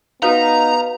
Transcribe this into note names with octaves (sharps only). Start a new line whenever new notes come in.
B3 D#4 F#4 B4 F5 A#5